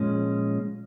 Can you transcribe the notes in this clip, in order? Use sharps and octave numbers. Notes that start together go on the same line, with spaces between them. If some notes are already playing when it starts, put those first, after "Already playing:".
Already playing: A#2 F3 G#3 C#4